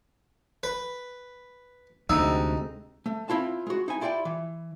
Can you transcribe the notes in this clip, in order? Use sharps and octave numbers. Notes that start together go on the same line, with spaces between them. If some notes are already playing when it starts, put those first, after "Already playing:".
B4
D2 C3 G#3 D#4 E6
A3
C4 E4 F4 A5
G#3 F#4
D#4 E4 G#5
E4 F4 G4 D5 G5
E3